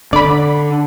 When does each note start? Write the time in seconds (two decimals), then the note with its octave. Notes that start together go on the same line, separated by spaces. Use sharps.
0.13 D3 D5 B5